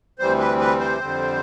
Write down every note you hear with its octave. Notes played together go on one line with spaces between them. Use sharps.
D2 C3 E3 G3 C4 C5
B4
B4
C5
F2 D3 G3 C4